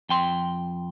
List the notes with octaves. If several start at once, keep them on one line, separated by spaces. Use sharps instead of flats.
F2 G5 C6